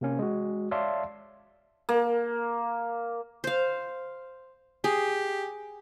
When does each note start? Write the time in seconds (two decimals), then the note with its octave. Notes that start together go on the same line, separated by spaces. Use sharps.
0.01 C3 A#3 C#4
0.19 G#3 F#4
0.71 C#5 D5 E5 F5 A5 C6
1.89 A#3
3.44 C5 F5
4.84 G4 G#4